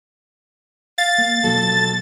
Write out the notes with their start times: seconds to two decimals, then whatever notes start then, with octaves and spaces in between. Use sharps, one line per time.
0.98 F5 A6
1.18 A#3
1.44 B2 F3 F#3 A4